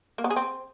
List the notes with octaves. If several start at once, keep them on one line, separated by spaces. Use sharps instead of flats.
A#3
B3
G#4
C4